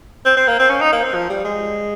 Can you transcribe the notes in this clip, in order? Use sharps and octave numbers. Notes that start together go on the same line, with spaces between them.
C4
C4
A#3
C4
C#4
D#4
A#3
C4
F3
G3
G#3